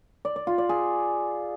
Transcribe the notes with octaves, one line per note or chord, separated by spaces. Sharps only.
D5
D5
F4
D5
G#4